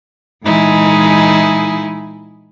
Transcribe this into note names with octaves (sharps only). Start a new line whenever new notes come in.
A#2 E3 G#3 D#4 E4 G#4